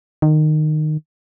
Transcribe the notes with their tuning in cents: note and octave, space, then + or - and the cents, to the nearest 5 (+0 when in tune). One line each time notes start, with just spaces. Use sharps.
D#3 -20